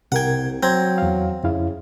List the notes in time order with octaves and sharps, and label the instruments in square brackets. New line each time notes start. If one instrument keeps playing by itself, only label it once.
[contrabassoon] C2 [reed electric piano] C3 A#4 G#6 [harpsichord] F#5 G5
[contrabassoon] F#3 [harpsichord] C4 A#5 [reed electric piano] G6 G#6
[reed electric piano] E2 F5
[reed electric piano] F2 E4 F5 [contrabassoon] C#3